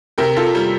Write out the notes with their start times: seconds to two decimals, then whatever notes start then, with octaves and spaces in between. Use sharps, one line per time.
0.18 C3 G4 A#4
0.36 F4 A4
0.55 G3